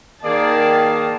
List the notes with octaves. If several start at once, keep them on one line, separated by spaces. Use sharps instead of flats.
D#3 A#3 G#4 D5 A5